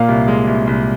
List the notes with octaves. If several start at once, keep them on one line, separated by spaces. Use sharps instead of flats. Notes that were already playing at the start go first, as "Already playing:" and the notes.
Already playing: A#2 A#3 F5
C2
G#3
C2
C2